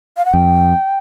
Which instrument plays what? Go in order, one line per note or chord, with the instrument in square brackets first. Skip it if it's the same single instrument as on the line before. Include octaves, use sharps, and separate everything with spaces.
[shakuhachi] F5
F#5
[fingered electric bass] F2 [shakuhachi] G5